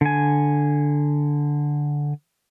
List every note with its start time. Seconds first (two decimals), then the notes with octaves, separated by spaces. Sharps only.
0.01 D3 G#5